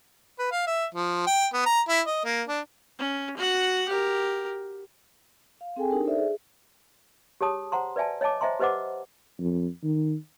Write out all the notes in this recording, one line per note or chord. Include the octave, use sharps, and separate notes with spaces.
B4
F5
E5
F3
G5
B3
A#5
E4
D#5
A#3
D4
C#4
F#4 F#5
G4 A#4
F5
C4 G#4 A4 G5 G#5
D4 D#4 G4 A#4
D#4 A4 C5 D5 E5
G#4
G4 G#4 C#5 A5 D#6
C5 F#5 A#5 C6
B4 D5 E5 G#5 A5
C#5 D#5 G#5 A5 D6
C5 D#5 E5 G#5 A#5 C6
G4 B4 C5 D#5 F#5 D6
F2
D#3